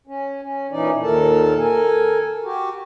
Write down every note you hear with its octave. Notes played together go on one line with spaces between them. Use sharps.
C#4
C#4
A#2 E3 C#4 D#4 D5
D#2 A#2 D#3 A4 A#4 A5
A4 A#4 G#5
F#4 G4